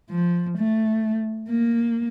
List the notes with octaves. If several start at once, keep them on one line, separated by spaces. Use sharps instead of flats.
F3
A3
A#3